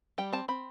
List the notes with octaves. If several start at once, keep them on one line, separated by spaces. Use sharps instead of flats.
G3 G5
C4 A5
C4 B5